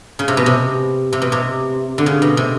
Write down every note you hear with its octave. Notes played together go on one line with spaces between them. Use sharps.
C#3
C3
B2
C3
C3
B2
C3
D3
C#3
B2
C3